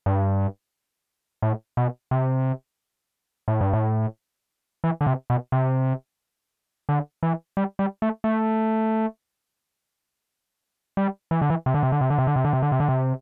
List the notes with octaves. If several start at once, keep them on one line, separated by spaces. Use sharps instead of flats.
G2
A2
B2
C3
A2
G2
A2
E3
D3
C3
B2
C3
D3
E3
G3
G3
A3
A3
G3
E3
D3
E3
C3
D3
C3
D3
C3
D3
C3
D3
C3
D3
C3
D3
C3
D3
C3